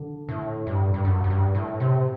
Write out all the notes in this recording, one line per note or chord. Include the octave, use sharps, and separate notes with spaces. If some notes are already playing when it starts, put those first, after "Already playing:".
Already playing: D3
A2
G2
G2
F#2
F#2
G2
A2
C3